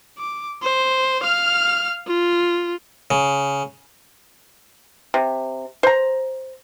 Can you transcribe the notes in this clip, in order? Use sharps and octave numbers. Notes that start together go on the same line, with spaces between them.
D6
C5
F5 F6
F4
C#3
C3
C5 A#5